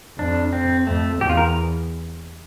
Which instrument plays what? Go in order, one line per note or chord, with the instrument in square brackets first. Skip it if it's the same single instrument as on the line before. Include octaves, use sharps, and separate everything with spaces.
[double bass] F2 [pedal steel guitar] D4
[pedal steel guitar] C4
[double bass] F2 [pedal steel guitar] A3
[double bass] E2 [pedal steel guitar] G4
[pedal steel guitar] F4
A#4